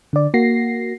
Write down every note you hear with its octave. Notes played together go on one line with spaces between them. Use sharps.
D3 D5
A#3 F#4 A#6 C7